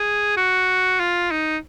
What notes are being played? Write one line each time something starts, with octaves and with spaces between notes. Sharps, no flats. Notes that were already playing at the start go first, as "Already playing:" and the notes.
Already playing: G#4
F#4
F4
D#4